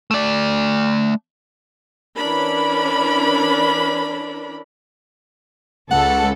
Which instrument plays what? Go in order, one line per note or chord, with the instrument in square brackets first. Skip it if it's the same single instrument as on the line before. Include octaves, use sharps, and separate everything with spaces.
[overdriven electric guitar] A3 D5
[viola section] E3 C#4 D4 A#4 B5
[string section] C#2 A4 [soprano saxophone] F#5